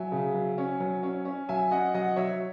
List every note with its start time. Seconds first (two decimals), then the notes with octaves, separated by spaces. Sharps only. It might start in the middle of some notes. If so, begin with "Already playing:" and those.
Already playing: F#3 E5 G#5
0.12 C#3
0.34 F#3
0.58 C#4
0.80 F#3
1.03 C#4
1.25 C#4
1.49 F#3 E5 G#5
1.71 C#4 D#5 F#5
1.94 F#3 D#5 F#5
2.16 F#3 C#5 E5